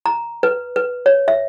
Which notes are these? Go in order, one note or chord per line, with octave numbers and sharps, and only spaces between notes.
A#5
B4
B4
C#5
E5